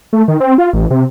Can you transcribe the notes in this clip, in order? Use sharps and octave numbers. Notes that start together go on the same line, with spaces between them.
A3
D#3
C4
F4
A1
C3